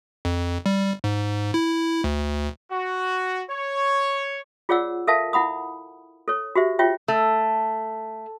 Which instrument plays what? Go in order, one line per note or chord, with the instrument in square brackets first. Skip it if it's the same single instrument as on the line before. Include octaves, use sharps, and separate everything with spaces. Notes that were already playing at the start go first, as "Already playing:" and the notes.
[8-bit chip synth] F2
G3
G#2
E4
D2
[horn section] F#4
C#5
[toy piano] F4 G#4 C#5 D5 F#5 E6
A4 A#4 E5 F5 A5
E4 F#5 B5 D#6
A4 C#5
F#4 G4 C5 E5
F4 C#5 E5 G5
[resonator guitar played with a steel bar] A3